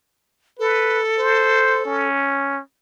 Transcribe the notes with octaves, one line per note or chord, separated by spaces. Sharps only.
A4 B4
C5
C#4